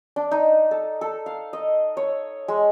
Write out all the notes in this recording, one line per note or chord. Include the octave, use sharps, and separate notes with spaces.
D4
D#4
A4
A4
F5
D#5
C#5
G#3